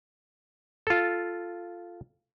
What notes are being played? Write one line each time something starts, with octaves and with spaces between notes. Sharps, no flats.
F4 A4